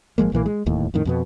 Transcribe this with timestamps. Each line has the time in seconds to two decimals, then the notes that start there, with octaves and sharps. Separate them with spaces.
0.18 G#1 F3 G#3 A#3
0.32 B1 A#2 E3 A#3
0.46 G#3
0.66 D1 D#2 A2
0.94 F2 A2 D#3
1.05 F2 B2 B3